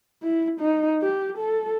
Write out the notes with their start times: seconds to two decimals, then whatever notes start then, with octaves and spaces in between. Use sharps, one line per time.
0.23 E4
0.59 D#4
1.02 G4
1.37 A4